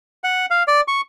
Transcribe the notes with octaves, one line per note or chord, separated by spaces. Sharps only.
F#5
F5
D5
C#6